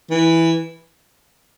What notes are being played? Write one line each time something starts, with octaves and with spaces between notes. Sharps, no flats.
E3